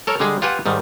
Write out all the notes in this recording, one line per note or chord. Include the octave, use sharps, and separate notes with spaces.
A4 A#4 C#5
D3 G3 G#3 G#4
F4 G4 B4 F#5 G#5
G#2 D#3 G3